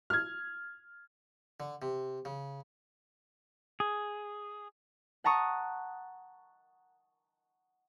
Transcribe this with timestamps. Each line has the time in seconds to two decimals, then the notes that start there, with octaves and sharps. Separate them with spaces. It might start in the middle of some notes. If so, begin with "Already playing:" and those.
0.10 F6 G#6
1.60 D3
1.82 C3
2.25 C#3
3.80 G#4
5.24 F#5 A5 A#5 C#6 D#6